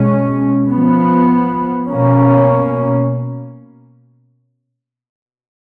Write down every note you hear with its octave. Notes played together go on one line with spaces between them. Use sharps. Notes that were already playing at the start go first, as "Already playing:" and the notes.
Already playing: B2 G#3 C#4
F3 B3
B2 A#3 C#4